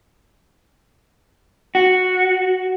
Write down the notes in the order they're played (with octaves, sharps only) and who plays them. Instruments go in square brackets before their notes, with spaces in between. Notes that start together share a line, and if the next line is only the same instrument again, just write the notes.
[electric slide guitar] F#4